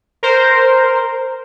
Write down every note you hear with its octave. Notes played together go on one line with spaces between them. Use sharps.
A#4 C5